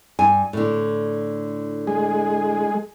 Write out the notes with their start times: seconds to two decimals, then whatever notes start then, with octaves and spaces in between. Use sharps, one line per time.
0.19 G2 G#5
0.53 A2 D3
1.87 G#3 G#4